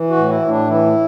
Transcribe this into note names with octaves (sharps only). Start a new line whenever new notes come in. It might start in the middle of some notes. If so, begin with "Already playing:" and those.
Already playing: E3
F#4
A2
E4
A2
D4
E3 E4